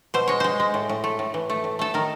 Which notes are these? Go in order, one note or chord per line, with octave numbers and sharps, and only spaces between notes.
B2 C5
G#3 C#5
G#3 C5
G#3
A2
A2
A3
A2
E3
A3
A2
A3 A4
D#3 A#4